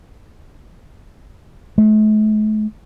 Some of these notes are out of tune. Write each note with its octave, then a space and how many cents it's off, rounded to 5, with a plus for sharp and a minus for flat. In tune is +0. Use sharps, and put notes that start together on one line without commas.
A3 -45